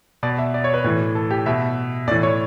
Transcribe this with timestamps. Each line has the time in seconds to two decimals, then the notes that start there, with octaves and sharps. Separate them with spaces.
0.23 B2 D5
0.38 E5
0.54 D5
0.64 C#5
0.74 B4
0.84 A2 E3
1.15 A4
1.31 G4
1.46 B2 E5
2.08 A2 D5
2.11 E3
2.23 C#5